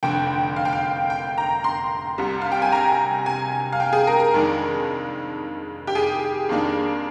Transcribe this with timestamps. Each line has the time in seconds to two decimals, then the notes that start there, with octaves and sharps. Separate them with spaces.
0.03 F1 F2 D3 G5
0.56 F5
0.65 G5
0.73 F5
1.10 G5
1.38 A#5
1.64 C6
2.18 C2 C3 G3
2.42 F5
2.52 G5
2.62 G#5
2.72 A#5
3.26 G#5
3.72 F5
3.80 G5
3.93 G#4
4.07 A#4
4.20 A#4
4.34 F2 D#3 G#3 D4
5.87 G4
5.95 G#4
6.49 F2 D#3 A#3 D4